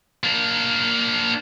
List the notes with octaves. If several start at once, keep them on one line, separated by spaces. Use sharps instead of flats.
A#3 D4